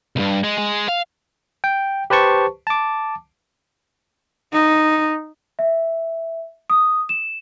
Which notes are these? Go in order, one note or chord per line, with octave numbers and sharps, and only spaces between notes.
C2 G2
G#3
G#3
F5
G5
G4 B4 C5 A5 C#6
A5 D6
D#4
E5
D#6
E7